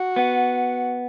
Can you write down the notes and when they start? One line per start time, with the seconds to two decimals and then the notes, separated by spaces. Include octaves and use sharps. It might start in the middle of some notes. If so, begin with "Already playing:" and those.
Already playing: F#4
0.16 B3